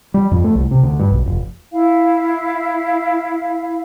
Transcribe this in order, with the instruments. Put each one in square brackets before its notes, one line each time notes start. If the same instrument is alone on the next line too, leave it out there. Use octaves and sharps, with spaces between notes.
[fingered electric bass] G3
F2
A3
C2
C3
D2
G2
B1
F1
[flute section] E4 F5